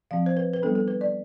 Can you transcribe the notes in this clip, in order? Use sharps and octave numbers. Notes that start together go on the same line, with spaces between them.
F3 C4 F5
C5
B4
B4
G3 B3 D4 A4
A4
B4
D5